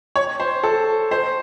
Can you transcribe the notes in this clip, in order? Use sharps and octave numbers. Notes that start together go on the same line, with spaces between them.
C#5
C5
A4
C5